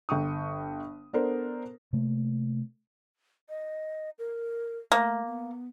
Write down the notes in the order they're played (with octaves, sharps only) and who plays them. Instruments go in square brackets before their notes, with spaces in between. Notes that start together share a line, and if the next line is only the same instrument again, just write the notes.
[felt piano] G1 G5 C#6 D#6
B3 D4 A4 A#4 C5
[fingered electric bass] C3 A3 A#3
[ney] D#5
A#4
[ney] A3 [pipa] A#3
[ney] B3